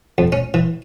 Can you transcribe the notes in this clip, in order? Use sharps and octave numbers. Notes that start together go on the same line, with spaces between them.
F2
C#4
E3